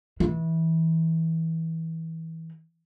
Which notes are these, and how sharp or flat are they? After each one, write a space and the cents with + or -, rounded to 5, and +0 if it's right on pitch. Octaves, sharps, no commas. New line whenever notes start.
E3 -25